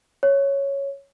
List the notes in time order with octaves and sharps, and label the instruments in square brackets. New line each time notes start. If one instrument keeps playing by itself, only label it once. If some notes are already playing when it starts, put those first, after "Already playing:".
[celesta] C#5